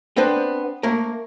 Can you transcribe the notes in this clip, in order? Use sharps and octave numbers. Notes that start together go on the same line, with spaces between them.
B3 C4 D4 B4 C5
A3 A#3 A#4